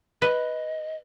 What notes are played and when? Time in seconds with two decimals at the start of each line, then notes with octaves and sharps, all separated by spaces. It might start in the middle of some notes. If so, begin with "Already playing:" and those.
0.22 B4 D#5